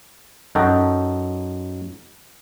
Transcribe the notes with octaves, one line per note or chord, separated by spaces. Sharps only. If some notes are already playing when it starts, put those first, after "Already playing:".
F#2 D#4 F#4 A4 G5